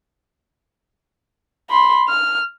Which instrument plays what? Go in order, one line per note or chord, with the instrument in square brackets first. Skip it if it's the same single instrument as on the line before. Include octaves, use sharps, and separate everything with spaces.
[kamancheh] B5 C6
F6